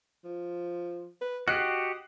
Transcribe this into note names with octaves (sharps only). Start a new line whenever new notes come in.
F3
B4
F#4 G4 D#5 F#6 C7